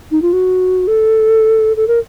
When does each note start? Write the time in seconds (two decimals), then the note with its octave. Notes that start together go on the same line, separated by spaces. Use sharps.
0.11 D#4
0.22 F4
0.33 F#4
0.87 A4
1.76 A4
1.88 A#4